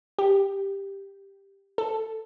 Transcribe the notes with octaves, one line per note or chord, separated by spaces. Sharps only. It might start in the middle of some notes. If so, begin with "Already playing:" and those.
G4
A4